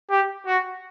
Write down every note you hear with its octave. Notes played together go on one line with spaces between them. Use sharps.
G4
F#4